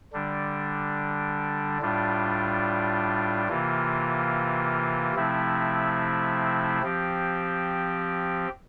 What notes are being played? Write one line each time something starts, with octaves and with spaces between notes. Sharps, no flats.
D3 G3 D4
A2 G3 D4 F4
C3 E3 A#3 F4
C3 F3 A3 C4 E4
F3 C4 G4